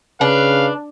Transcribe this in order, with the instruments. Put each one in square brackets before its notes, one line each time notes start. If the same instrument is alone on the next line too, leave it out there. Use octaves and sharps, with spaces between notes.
[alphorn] C#3 [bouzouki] D4 [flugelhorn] B4 [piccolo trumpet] F5